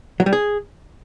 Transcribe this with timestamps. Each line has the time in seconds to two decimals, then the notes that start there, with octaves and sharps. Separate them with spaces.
0.20 F#3
0.26 G3
0.33 G#4